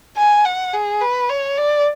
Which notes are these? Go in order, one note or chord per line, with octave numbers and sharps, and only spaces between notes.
G#5
F#5
G#4
B4
C#5
D5